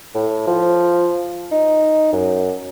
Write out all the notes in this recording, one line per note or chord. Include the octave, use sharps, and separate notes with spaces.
A2
F3
D#4
F#2